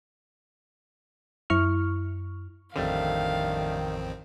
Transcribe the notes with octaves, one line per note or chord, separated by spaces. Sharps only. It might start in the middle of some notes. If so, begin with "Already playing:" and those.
F#2 E4 C#6 F6
A1 F2 D3 D#3 G3 A3 C4 F5